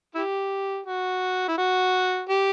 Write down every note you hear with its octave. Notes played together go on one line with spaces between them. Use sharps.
E4 G4
F#4
E4
F#4
G4